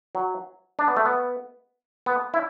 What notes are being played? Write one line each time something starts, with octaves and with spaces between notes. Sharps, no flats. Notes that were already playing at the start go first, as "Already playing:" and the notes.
F#3
D4
B3
A3
B3
B3
E4